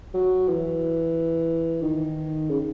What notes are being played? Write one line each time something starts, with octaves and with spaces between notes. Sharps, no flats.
F#3
E3
D#3
C#3